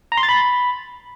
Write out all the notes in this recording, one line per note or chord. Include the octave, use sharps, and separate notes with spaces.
A#5
C6
A6
B5